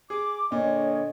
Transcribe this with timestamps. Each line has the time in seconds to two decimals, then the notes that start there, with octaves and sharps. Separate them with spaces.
0.10 G#4 D6
0.52 A#2 D3 C#5 D#5